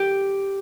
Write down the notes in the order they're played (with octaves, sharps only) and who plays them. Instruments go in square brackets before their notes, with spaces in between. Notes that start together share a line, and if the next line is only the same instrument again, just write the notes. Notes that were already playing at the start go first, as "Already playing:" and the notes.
Already playing: [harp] G4